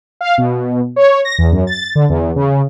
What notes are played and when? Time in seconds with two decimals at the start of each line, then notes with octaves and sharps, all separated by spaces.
0.21 F5
0.38 B2
0.96 C#5
1.25 A#6
1.38 E2
1.52 F#2
1.67 A6
1.95 D3
2.09 E2
2.36 C#3